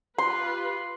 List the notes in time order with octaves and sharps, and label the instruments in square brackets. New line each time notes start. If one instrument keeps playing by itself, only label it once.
[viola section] F4 G4 B4 [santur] C6